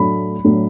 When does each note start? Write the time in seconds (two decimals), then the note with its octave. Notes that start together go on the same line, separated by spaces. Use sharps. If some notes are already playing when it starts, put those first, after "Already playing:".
Already playing: A2 F#3 A3 D4 B5
0.45 A2 F#3 A3 D4